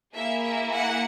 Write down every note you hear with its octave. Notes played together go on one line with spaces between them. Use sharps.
A#3 E4 G#4 E5
E5
F#5